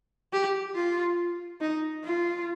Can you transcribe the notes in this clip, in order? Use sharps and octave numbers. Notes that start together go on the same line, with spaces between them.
G4
F4
D#4
F4